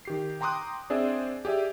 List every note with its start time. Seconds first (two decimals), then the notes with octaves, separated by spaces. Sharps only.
0.05 D#3 G4 C7
0.41 G5 A#5 C6 D6 D#6 F#6
0.90 C4 D4 G#4 C5 D5 E5
1.45 G4 G#4 D5 E5